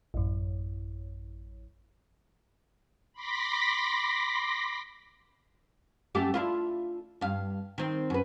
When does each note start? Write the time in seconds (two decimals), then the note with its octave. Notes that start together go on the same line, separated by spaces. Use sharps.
0.14 A1 F#2
3.13 B5 C6 D6 A#6 B6
6.15 F#2 A3 G4
6.34 D4 E4 F4
7.21 G2 F5
7.78 D#3 C4
8.10 F#2 B4